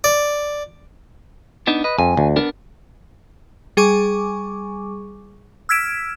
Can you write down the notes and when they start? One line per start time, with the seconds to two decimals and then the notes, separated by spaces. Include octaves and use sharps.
0.04 D5
1.67 B3 D4 D#4
1.84 B4 D#5
1.99 F2 G#5
2.17 D2
2.36 B3 D4 A#4
3.77 G3 G#4 G#5 C#6 D6
5.69 E6 F6 G#6 B6 D7 E7